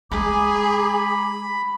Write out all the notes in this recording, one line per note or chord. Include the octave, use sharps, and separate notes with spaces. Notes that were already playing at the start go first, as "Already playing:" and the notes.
G#3 G#4 G#5 A#5 B5 D6